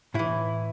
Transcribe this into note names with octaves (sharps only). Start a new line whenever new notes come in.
A2 E3 E4